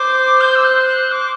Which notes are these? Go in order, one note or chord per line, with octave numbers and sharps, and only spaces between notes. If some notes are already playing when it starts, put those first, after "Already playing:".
Already playing: C5 D6
G6
E6
F#6
F#6
D6